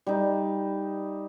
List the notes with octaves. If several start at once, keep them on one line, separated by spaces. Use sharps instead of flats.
G3 D#4